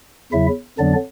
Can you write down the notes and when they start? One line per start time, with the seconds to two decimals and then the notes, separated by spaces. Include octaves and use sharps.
0.32 E2 C#3 F#3 E4 E5
0.78 F2 D3 F#3 B3 D4 D5